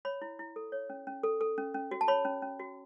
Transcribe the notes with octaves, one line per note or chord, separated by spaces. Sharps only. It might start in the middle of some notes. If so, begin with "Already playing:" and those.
C#5 B5
E4
E4
A4
C#5
C#4
C#4
A4
A4
C#4
C#4
F#4
A5
C#5 B5
C#4
C#4
F#4